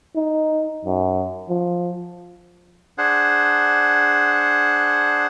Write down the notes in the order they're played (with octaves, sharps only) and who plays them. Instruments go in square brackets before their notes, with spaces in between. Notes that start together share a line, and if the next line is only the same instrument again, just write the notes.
[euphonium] D#4
F#2
F3
[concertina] D4 G#4 C5 F#5